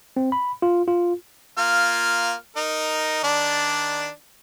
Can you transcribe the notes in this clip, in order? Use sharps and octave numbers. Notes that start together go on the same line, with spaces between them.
C4
B5
F4
F4
A#3 F4 F6
D#4 A#4
D#3 D4 D5